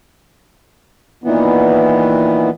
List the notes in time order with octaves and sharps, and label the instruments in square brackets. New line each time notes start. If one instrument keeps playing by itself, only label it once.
[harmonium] A#2 D#3 E3 B3